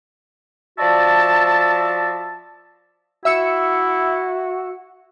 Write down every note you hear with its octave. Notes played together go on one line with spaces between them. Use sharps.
F3 F#4 D5 E5 A5
E4 F#4 E5 E6 C#7